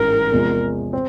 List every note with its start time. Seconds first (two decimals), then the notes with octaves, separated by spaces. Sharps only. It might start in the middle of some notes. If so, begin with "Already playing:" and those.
Already playing: A1 G#2 E3 A#4
0.32 E2 C3 F3 G#3
0.93 C4